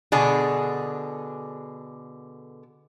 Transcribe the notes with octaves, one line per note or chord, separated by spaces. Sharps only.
B2 D3 D4 G#4